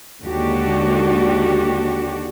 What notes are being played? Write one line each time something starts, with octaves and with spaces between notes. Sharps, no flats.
D#2 D3 G#3 D4 F#4 G4